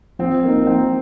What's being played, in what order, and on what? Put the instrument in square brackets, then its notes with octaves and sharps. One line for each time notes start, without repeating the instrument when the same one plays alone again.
[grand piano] F3 [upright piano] C4
[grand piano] A#3 D#4
[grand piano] F3 [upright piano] C4